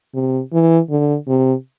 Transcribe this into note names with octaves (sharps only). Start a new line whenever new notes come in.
C3
E3
D3
C3